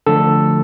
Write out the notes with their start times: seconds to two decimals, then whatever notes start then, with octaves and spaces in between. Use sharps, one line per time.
0.07 D3 F3 A3 A4